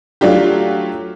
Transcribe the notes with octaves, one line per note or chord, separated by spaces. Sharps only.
F#3 A3 D4 F4 G4